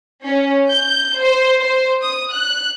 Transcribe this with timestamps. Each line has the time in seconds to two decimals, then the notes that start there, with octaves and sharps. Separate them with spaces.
0.25 C#4
0.69 G6
1.21 C5
1.61 C5
2.02 D#6
2.34 F#6